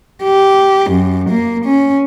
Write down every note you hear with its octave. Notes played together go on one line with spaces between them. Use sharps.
G4
F#2
A#3
C#4